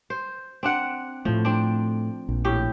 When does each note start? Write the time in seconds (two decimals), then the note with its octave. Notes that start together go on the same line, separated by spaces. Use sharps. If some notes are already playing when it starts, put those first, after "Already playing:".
0.10 C5
0.63 C4 D4 F#5
1.25 A2 F3 A3
1.45 C4 D4
2.29 A#1
2.45 A2 G4